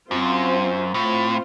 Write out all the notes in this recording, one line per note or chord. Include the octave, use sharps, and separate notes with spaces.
F#2 C4 F4 C5
A2 C4 F4 C5